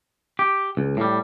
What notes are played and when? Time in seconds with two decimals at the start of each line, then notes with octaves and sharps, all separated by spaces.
0.39 G4
0.77 C#2
0.97 A2 G3